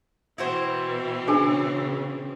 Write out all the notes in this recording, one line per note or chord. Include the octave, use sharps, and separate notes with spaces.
B2 E3 C4 E4 F#4 C5
C#3 D4 G#4 C#5 G#5